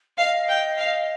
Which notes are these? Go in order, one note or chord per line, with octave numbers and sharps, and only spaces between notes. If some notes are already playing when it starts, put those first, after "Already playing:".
D#5 F5
G5
F5